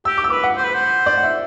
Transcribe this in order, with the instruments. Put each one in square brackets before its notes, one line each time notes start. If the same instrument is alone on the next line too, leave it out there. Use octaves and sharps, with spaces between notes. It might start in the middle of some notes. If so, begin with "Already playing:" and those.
[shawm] G4 [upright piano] E6
[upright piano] D6
E6
[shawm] B4 [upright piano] D6
[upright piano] F#5
[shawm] C5
B4
C5
[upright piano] D5
F#5
E5